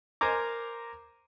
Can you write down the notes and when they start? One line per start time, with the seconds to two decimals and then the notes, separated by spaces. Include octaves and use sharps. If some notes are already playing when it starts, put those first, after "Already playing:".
0.21 A#4 C5 G#5 A#5 D6